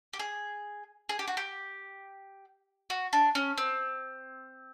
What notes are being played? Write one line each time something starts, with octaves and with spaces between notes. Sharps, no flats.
G4
G#4
G#4
G4
F#4
G4
F#4
D4
C#4
C4